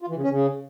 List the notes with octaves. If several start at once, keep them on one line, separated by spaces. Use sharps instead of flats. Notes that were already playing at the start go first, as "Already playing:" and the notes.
F4
E3
C#3
C#4
C#3